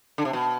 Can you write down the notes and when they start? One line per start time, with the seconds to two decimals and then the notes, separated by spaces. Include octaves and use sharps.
0.18 D3
0.25 C3
0.33 B2